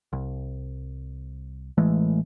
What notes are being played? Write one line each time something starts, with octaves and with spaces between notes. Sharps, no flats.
C2
A1 E3 G#3 A3